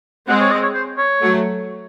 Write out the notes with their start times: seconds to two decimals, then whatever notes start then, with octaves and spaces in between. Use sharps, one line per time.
0.28 G#3 C4 F#5
0.41 C#5
0.52 D#5
0.62 C#5
0.74 C5
0.98 C#5
1.21 F#3 A3